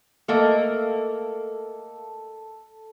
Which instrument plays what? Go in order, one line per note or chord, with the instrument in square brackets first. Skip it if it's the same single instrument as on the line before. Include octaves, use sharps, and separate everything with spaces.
[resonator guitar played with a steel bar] A3 A#3 D#5 [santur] A4